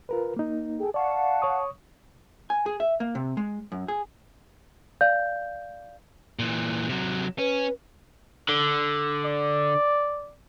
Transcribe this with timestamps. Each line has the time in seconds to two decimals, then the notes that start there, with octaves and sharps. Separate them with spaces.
0.09 F4 A#4 B4
0.36 A#3 D#4
0.79 G#4 A4 G5
0.94 D5 F5 F#5 A5 C#6
1.42 C#5 C#6 D#6
2.50 G#5
2.66 G#4
2.80 E5
3.00 A#3
3.15 C3
3.37 G#3
3.72 F#2
3.88 G#4
5.01 D5 F5 G6
6.39 A#2 E3
6.89 C3 F#3
7.39 C#4 B4
8.49 D3
9.25 D5